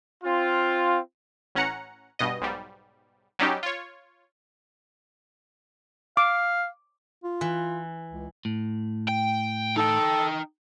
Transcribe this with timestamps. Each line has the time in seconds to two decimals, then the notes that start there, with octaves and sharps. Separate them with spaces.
0.24 C4 F4
1.55 A1 C#4 F#5 A#5 C#7
2.19 G2 B2 D#5
2.41 B1 G#2 G3
3.39 F#3 G3 C#4 D#4 G4
3.63 F4 C#5
6.17 F5 D6
7.24 F4
7.41 E3
8.11 C#2
8.45 A2
9.09 G5
9.77 D#4 A4 G5